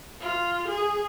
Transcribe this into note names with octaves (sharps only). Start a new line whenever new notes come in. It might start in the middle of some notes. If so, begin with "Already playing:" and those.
F4
G#4